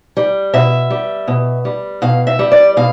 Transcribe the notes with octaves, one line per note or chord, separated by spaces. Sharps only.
G3
B2 E5
G3
B2
G3
B2 F5
E5
G3
D5
B2 F5